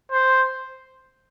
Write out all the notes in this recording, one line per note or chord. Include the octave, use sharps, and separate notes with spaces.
C5